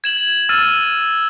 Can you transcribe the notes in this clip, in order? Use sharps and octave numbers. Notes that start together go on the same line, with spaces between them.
G#6 E7 F#7
E6 F6 A6 D#7 E7